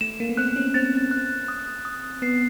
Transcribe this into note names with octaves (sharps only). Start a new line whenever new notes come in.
A3 E7
A#3
B3
C4 F#6
C#4
C4 A6
F#6
D#6
D#6
B3 C7